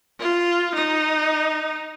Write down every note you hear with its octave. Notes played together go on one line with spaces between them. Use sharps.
F4
D#4